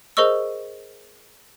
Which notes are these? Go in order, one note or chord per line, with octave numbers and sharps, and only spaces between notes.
G#4 A#4 C5 D#5 C#6 E6